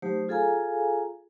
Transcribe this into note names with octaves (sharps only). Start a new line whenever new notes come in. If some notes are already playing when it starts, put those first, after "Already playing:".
F#3 A3 D#4 G4 C5
F4 G#4 A4 F5 G#5 A#5